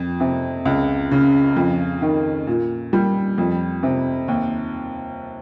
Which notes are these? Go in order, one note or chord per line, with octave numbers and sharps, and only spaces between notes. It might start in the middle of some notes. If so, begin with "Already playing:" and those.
Already playing: F2
C3
C#2
C#3
F2
D#3
A#2
G3
F2
C3
D#2